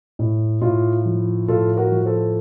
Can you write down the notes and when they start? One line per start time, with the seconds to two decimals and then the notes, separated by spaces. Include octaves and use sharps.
0.19 A2
0.61 A2 F4
1.05 F3
1.48 A2 F4 A4
1.77 F#4 A#4
1.92 F3
2.06 A4 C5